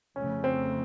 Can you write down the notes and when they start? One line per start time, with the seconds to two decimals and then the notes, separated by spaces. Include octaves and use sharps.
0.15 F2 C#3 A3 C#4
0.44 C4